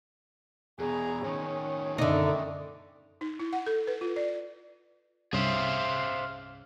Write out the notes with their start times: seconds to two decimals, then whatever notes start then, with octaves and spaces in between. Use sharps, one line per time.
0.79 E2 B2 G#4 A#5
1.24 A2 D#3 C#4
1.98 F#2 D3 D#4 D5 E5
3.21 D#4
3.39 E4
3.53 F#5
3.66 A4
3.87 B4
4.01 F4
4.16 D5
5.33 C2 G2 C#4 G#4 C5 E5 F5